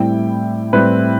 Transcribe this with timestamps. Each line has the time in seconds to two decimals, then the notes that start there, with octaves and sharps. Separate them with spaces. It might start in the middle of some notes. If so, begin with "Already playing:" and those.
Already playing: A2 G3 C4 E4 G5
0.73 A2 G3 C4 E4 B4